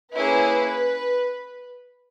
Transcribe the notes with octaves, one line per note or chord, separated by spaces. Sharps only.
A#3 C#4 E4 G#4 B4